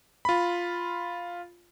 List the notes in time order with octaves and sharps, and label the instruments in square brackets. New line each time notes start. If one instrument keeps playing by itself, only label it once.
[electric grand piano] F4 B5